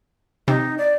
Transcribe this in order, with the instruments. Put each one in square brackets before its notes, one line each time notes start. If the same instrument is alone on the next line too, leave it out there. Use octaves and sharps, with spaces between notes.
[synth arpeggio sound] C3 [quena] D#4
[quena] D5